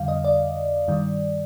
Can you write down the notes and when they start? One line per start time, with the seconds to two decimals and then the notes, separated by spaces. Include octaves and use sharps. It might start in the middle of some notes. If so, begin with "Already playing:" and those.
Already playing: F2 D3 G3 F5
0.08 D#5
0.24 D5
0.88 G2 D#3 G3